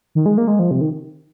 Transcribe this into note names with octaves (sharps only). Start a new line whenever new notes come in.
D#3
G#3
A#3
G#3
F3
C3
D#3